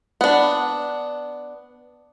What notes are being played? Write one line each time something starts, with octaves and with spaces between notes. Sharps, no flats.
B3 D4